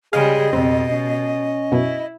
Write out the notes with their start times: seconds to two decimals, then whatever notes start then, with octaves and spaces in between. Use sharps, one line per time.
0.13 C#3 G3 G#3 G#4 D#5 F5
0.53 F2 B2 C4
0.92 C#4
1.72 F#2 B2 E4